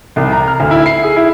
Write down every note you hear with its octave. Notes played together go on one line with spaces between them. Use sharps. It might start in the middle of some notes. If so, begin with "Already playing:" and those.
C2
A#5
F6
D2
E4
C7
G#4
E4